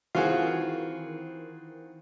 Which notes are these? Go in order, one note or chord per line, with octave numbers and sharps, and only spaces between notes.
D#3 E3 C4 F4 F#4 G#4